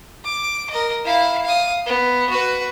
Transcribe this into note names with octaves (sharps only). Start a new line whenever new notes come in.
D6
A#4 D#5
E4 F5
F5 D#6
B3
F#4 B4